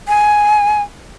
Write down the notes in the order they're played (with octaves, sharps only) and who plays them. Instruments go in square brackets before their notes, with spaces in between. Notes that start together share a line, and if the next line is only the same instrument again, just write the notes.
[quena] G#5